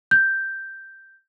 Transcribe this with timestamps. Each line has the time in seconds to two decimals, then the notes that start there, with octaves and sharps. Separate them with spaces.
0.11 G6